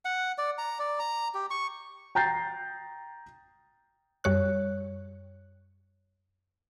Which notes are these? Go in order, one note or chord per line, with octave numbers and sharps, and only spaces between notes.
F#5
D5
A#5
D5
A#5
G4
C#6
G5 A#5 G6 A6 C7
F#2 G3 C#5 F#6